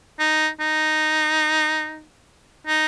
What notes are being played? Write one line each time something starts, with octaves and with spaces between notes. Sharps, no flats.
D#4
D#4
D#4